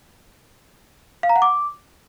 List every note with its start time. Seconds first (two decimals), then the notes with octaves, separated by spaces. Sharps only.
1.23 F5
1.29 A#5
1.36 F#5
1.42 D6